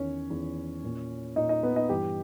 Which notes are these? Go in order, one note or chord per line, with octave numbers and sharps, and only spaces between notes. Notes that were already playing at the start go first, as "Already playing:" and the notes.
Already playing: E2 D#3 C#4 C#5
E2 D#3
A#2
A#2 D#4 D#5
D#4 D#5
B3 B4
D#4 D#5
G2 E3 G4